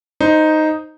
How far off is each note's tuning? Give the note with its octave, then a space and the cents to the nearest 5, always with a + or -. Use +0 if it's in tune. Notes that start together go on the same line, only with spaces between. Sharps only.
D#4 +0 C5 +0